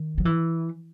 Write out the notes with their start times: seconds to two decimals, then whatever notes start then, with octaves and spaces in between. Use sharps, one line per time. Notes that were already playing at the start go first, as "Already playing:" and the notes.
Already playing: D#3
0.18 F#3
0.25 E3